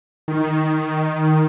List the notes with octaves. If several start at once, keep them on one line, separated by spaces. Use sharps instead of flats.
D#3